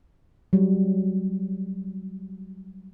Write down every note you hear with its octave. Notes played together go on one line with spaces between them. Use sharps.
F#3 G3